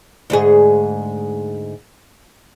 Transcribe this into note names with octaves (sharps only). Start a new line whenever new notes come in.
D2 G#2 G#4